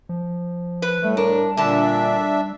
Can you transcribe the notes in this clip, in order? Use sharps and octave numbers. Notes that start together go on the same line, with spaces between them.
F3
B4
A2 G3 A3
D4 A#4
A#2 D3 D4 E5 A5